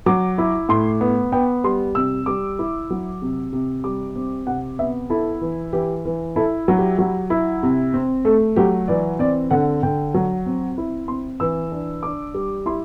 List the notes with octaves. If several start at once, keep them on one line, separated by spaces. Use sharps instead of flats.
F#3 D6
E4
A2 C6
B3
B3 G5
G3 C6
C3 E6
G3 D6
E4
F#3
C3
C3
G3 D6
C4
C3 F#5
B3 E5
E4 A4
E3
E3 G4
E3
E4 A4
F#3
G4
F#3
E4
C3
C4
A3 A4
F#3 G4
E3 D5
C4 D5
D3 F#5
D3 G5
F#3
C4
E4
C4 C6
E3 E6
D4
D4 D6
G3
E4 C6